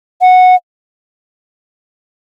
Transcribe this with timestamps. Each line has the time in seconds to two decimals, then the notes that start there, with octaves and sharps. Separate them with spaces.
0.21 F#5